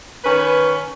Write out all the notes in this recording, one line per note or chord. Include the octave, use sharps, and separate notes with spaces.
D#3 C#4 B4